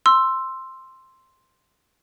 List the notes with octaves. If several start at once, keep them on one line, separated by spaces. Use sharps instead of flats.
C6 E6